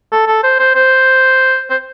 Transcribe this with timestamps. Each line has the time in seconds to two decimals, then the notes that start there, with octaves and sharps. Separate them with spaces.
0.12 A4
0.27 A4
0.43 C5
0.59 C5
0.74 C5
1.70 C5